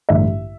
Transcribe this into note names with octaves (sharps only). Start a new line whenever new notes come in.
A1 G2 D3 E5